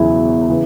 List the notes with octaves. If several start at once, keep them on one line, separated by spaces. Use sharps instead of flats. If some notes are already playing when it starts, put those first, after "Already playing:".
Already playing: E1 E2 C#3 F#3 E4 G#4
C#3 E3